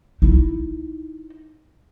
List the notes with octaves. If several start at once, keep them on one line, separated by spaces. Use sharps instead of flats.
D#4 E4